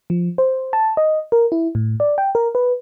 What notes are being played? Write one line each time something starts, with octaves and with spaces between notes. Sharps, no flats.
F3
C5
A5
D#5
A#4
E4
A2
D5
G5
A#4
B4